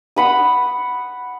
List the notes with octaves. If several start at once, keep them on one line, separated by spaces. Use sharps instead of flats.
F#5 B5 D#6